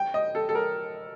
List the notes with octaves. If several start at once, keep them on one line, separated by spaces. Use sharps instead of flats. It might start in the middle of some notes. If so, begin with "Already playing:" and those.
Already playing: G5
D#5
A4
A4
A#4